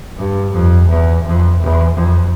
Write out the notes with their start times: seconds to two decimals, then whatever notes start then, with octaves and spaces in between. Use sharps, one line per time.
0.17 G2
0.53 F2
0.88 E2
1.24 F2
1.59 E2
1.93 F2